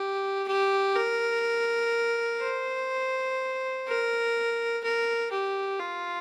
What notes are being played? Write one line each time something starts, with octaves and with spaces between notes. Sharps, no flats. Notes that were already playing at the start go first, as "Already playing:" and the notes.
Already playing: G4
G4
A#4
C5
A#4
A#4
G4
F4